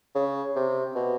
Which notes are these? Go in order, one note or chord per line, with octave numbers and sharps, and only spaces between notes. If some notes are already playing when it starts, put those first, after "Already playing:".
C#3
C3
B2